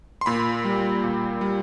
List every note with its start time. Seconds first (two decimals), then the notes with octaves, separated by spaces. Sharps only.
0.21 C6
0.26 A#2 B5
0.65 G3
1.04 A#2
1.41 G3